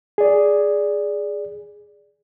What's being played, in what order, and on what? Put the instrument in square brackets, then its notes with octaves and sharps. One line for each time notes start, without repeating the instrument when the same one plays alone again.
[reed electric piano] G#4 D5